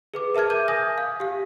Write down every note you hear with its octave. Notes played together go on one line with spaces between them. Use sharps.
G#4 B4 D6
A#4 E5 A5 F6 G#6
D6 G6 D#7
G#5 D#6 G6 A#6
F5
G4 F5